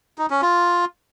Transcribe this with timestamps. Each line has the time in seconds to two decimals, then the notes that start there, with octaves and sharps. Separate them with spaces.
0.18 D#4
0.30 C#4
0.42 F4